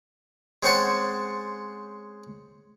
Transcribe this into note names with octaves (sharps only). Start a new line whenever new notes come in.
G#3 C4 C#4 C5 F#5 A5